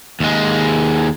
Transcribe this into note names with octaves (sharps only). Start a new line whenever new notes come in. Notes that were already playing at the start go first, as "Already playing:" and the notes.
D#2 G#3